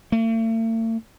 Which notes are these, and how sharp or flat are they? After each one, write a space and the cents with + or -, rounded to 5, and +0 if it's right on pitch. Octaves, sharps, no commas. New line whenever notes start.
A3 +45